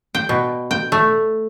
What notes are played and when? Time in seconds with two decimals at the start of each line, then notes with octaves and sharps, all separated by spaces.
0.15 G5
0.29 B2
0.71 G5
0.92 A3